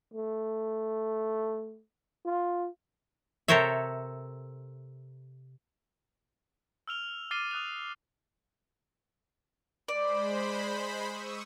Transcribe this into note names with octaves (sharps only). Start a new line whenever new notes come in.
A3
F4
C3 A4 A#4 C5 C#5 E5
E6 F6 F7 G7
D6 F6 A6 C7 D#7 G7
D#6 F#6 F7
G#3 C5 D5 B5
C#6 D#6 E6